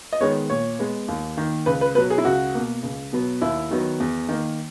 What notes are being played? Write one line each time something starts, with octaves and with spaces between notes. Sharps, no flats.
D#5
D#3 G#3 B3 C#5
A#2 C#5
G#3 B3
D#2
D#3 A#3
C#2 B4
B4
B2 F#3 B4
G#4
E4
C#2 F#4
B2 A#3
C#2
B2 F#3 B3
D#2 E4
D#3 F#3 B3
E2
D#3 A#3